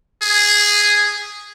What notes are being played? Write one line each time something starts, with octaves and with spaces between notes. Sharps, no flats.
G#4